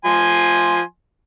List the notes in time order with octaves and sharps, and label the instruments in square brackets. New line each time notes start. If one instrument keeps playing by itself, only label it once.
[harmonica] F3 G#5 C6